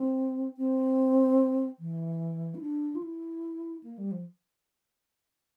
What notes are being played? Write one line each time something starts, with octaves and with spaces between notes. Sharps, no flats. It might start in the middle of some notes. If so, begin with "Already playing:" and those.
Already playing: C4
C4
E3
E4
D4
F4
E4
A#3
G3
F3